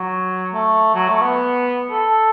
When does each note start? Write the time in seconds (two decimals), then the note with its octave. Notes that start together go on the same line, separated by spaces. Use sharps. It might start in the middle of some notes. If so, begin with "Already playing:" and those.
Already playing: F#3
0.54 A3
0.95 F#3
1.09 A3
1.22 B3
1.90 A4